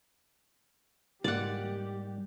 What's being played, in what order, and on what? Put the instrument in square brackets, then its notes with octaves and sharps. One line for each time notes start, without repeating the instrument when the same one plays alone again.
[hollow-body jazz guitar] G#2 A#3 [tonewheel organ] G3 [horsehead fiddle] G4 [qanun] D5 F#5